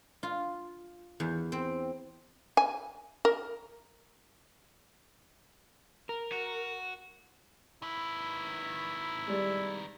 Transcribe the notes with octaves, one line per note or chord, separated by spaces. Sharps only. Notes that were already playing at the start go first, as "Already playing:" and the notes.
F4
E2
C4
G#5
A#4
A#4
F#4
D#3 E4 B4
G3 G#3